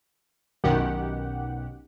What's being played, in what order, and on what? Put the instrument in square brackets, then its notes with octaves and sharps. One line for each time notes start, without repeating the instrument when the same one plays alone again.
[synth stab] B1 F#2 B2 D#3 G4 F#5